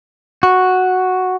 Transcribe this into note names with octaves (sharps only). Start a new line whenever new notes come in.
F#4